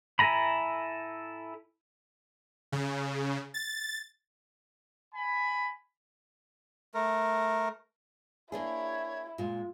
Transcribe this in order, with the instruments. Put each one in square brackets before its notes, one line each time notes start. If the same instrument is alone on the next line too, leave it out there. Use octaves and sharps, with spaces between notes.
[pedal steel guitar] E4 A4 G#5 A#5 B5
[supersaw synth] C#3
A6
[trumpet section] G#5 B5
[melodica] A3 A#4
[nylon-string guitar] A#3 D4 G#4 [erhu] E4 [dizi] C#5
[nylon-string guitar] A#2 G#3 [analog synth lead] F4